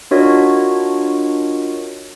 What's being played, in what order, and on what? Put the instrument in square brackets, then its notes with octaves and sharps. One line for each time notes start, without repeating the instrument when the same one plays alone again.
[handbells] D4 F4 F#4 A#4 C#5 D#5